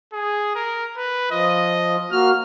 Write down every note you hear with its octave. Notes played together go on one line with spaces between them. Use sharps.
G#4
A#4
B4
F3 F4 D#5
A#3 F#4 F6